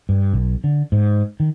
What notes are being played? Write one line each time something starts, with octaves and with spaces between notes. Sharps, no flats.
G2
B1
D3
G#2
D#3